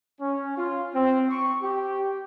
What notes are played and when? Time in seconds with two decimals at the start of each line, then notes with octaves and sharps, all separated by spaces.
0.20 C#4
0.57 F4
0.95 C4
1.30 C#6
1.63 G4